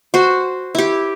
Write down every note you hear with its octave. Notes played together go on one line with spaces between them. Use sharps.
F#4 C5
E4 G4